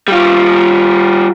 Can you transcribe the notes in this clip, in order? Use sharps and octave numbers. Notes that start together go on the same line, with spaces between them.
G3 F4